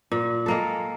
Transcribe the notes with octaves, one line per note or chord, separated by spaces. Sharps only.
A#2
G#3 A#3 A4